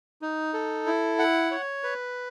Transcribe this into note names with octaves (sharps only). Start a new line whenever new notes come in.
D#4
A4
E4
F#5
C#5
B4